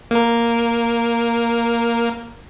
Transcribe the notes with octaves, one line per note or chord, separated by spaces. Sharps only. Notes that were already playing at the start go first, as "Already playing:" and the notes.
A#3 A#4